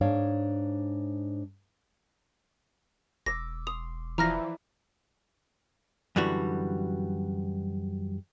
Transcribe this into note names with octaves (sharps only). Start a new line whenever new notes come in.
G#2 D4 C#5 D5 F5
E1 D6 E6 A#6
C6 D#6 F7
E3 F3 E4 D5 A#5 F6 A#6
F#2 D3 E3 G3 F#4